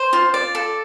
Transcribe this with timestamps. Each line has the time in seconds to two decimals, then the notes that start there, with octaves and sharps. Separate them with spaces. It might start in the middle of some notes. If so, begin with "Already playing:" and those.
Already playing: C5
0.13 F4
0.34 D5
0.55 A4